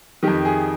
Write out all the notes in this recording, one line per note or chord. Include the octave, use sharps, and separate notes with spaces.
F2 D#3 G4
G#4